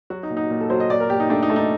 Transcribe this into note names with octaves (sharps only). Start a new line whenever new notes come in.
F#3 F#4
D#4
A#2
D#4
A#2
A4
F#3 C5
D#5
A#2 D5
A#4
A#2 G4
D#4
A3 D4
D#4
A3
D#4